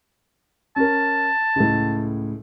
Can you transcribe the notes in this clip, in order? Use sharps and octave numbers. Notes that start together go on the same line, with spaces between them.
C#4 A#4 A5
C#2 A2